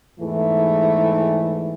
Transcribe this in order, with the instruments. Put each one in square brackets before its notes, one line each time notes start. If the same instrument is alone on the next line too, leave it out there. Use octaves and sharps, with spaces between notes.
[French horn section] E2 G#2 E3 A3